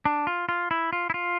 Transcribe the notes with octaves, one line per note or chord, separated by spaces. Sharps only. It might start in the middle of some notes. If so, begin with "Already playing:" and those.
D4
F4
F4
E4
F4
E4
F4